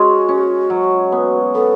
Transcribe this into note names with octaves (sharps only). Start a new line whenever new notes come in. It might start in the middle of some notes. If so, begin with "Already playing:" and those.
Already playing: G#3 C#4 F#4
C#4
F#3
B3
B3 A4